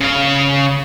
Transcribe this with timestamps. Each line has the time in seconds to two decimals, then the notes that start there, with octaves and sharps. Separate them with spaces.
0.01 C#3 F5